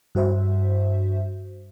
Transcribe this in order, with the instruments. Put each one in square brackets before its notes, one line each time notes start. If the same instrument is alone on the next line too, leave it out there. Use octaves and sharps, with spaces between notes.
[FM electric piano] G2 F#4 C5 E5